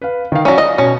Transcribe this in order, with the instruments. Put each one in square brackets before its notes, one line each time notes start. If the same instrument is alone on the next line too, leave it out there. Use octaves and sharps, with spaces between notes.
[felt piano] B4 F5
D#3 F5
[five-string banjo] F#3 C#4 [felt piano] D5
[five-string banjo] D#5
[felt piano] B2 [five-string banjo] C#4